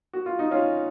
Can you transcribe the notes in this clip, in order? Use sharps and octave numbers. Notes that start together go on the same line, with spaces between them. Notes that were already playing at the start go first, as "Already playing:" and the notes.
F#4
F4
D#4
C#4 F4